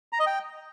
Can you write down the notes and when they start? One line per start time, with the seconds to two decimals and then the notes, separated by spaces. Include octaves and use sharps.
0.13 A#5
0.20 D#5
0.27 G5